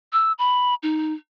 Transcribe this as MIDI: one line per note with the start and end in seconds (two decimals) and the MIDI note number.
0.13 0.32 88
0.39 0.74 83
0.83 1.13 63